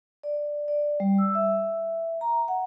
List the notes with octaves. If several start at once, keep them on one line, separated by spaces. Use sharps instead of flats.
D5
D5
G3
E6
E5
A#5
F#5